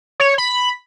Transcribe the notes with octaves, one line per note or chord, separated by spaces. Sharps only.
C#5
B5